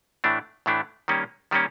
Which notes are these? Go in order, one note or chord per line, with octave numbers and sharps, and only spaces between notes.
A2 E3 A3 D4
A2 E3 A3 D4
D#3 G3 A#3 C#4
D#3 G3 A#3 C#4